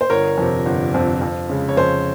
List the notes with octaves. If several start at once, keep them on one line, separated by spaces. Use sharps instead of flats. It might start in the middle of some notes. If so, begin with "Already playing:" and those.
C5
G1 A#4 C#5
F2 C3
G1
F2 C3
F2
C#3 G#3
C#5
F2 C5